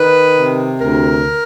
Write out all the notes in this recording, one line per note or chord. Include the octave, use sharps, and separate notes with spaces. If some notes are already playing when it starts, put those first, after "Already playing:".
Already playing: D#3 B4
C3
D2 A#4